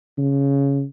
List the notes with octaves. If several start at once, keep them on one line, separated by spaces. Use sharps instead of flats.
C#3